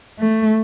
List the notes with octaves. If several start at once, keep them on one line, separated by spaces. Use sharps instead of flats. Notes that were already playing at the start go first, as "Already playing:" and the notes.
A3